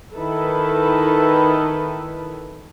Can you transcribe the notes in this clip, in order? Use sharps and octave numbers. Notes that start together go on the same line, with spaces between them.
D#3 E4 A4 B4